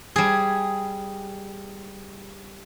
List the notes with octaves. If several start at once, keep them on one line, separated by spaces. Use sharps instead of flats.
G3 G#4